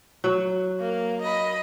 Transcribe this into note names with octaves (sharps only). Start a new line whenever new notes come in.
F#3
A#3
D#5 B5